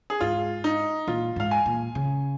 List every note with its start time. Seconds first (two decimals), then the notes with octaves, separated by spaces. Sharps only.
0.10 G#4
0.20 G#2 F4
0.64 D#4
1.08 A#2 F4
1.36 G#2 F5
1.51 G#5
1.66 A#2
1.95 C#3